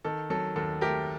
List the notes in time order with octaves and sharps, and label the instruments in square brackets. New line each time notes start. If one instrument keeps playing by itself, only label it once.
[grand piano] D#3 A4
F#3 A4
D#2 A4
A3 G4 A#4